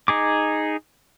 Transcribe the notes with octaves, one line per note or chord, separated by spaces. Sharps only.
D#4 G#4 D6